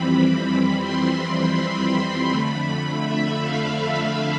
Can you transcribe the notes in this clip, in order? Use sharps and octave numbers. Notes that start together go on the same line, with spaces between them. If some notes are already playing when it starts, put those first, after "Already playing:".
Already playing: F2 E3 G3 C4 B5
C6
B5
F2 D3 A3
E5
F5